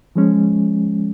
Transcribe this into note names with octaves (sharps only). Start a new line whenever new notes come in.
F3 G#3 C#4